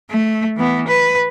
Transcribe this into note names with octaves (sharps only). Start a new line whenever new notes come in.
A3
E3 B3
B4